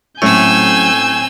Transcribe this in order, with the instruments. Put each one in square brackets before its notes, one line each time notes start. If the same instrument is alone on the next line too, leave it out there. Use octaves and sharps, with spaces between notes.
[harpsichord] A2 [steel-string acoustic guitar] F#3 A3 C#4 [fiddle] C4 E6 [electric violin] G#5 G6